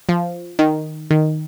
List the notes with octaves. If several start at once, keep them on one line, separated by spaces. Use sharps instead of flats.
F3
D#3
D#3